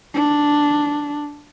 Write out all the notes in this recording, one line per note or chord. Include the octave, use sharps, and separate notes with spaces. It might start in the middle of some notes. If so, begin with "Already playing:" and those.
D4